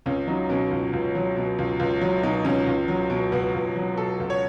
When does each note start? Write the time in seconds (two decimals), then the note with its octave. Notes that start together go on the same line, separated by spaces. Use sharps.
0.06 C#2 C#4
0.27 F#3 D#4
0.49 B2 C#4
0.71 C#2
0.93 C#2
1.15 F#3
1.36 B2
1.58 C#2
1.79 C#2
2.01 F#3
2.23 B2 D#4
2.45 C#2 C#4
2.67 C#2
2.88 F#3
3.10 B2
3.32 C#2 B3
3.54 C#2
3.76 F#3
3.97 B2 A4
4.20 C#2
4.30 C#5